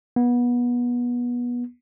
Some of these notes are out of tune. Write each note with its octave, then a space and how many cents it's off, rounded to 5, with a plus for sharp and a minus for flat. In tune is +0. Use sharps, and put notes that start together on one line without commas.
B3 -25